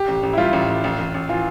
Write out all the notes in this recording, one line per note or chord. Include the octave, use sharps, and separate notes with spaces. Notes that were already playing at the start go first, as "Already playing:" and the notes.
Already playing: G4
A1
A1
E4
G3 F4
A1
A1
A1
A1
A1
E3 F4